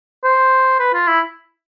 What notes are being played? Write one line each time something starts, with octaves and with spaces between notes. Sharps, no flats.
C5
B4
F4
E4